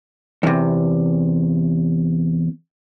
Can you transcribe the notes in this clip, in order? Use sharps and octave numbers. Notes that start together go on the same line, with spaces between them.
E2 C3